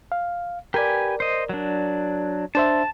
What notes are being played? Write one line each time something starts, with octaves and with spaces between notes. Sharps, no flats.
F5
G4 A#4 B4 D5 G#5
C5 D#5
F#3 D4
D4 C5 E5 A5